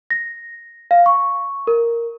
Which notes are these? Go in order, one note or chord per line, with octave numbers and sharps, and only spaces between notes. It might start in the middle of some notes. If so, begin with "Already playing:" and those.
A#6
F5
C#6
A#4